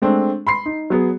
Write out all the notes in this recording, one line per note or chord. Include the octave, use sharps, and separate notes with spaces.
G#3 A3 C4 D4
B5 C6 C7
D#4
F#3 B3 G#4